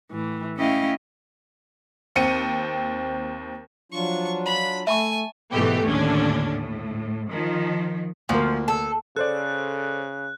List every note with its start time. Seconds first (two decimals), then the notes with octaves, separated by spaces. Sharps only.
0.11 A2 E3
0.56 A3 C#4 E4 D#5 F5 G5
2.16 D#2 C4 C#7 D#7
3.92 F3 F#3 D4 F4 C#6
4.46 B5
4.87 A3 E5 G#5 A5 B5 C#6
5.52 G#2 B2 E3 A3 B3 G4
5.86 D#2 A2 D3 C#4 D4
6.50 A2
7.32 D#3 F3
8.29 D2 F3 A#3
8.68 A4
9.16 C#3 A4 C5 D5 F#6